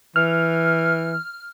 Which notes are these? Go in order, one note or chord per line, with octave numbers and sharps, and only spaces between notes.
E3 F6